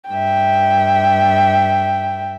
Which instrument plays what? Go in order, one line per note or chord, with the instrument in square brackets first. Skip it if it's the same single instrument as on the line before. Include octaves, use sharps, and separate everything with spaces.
[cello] G2 E5 [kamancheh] G5